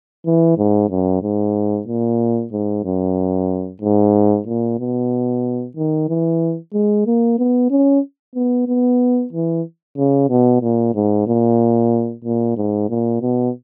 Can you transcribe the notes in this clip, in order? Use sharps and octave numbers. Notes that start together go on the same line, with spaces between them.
E3
G#2
F#2
G#2
A#2
G#2
F#2
G#2
A#2
B2
D#3
E3
G#3
A#3
B3
C#4
B3
B3
E3
C#3
B2
A#2
G#2
A#2
A#2
G#2
A#2
B2